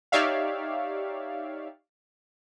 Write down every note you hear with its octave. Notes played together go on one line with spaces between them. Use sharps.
D#4 G4 C#5 D5 E5 F5